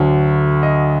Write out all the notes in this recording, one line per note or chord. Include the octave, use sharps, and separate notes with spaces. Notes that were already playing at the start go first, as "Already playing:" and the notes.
Already playing: D2 D3 F#3
D#5